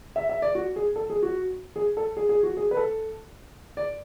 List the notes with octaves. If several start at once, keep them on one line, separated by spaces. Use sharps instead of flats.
E5
E5
D5
F#4
G#4
A4
G#4
F#4
G#4
A4
G#4
G#4
F#4
G#4
B4
A4
D5